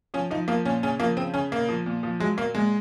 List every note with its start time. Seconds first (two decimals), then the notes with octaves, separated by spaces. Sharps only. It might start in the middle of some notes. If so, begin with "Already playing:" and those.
0.14 F3 C#4
0.30 F3 D#4
0.48 F3 A#3
0.65 A#2 C#4
0.83 C#3 C#4
1.00 F3 A#3
1.17 C#3 C4
1.34 C#3 C#4
1.52 A#2 A#3
1.69 F3
1.86 A#2
2.03 F3
2.20 F#3 G#3
2.37 A#2 A#3
2.55 A#2 G#3